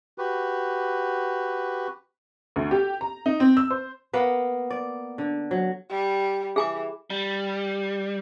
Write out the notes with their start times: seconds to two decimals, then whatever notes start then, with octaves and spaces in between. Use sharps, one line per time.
0.18 F#4 G4 B4
2.56 D2
2.71 G4
3.01 A#5
3.26 D#4
3.40 C4
3.57 E6
3.70 C5
4.13 A#3 B3 B4
4.70 D5
5.18 D3
5.51 F#3
5.90 G3
6.56 E3 G#4 G#5 D6
7.10 G3